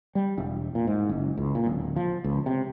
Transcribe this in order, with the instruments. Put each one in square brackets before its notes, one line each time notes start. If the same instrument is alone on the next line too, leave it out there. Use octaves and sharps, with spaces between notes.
[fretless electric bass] G3
E1
A#2
G#2
F#1
C#2
A#2
D1
F3
C#2
C3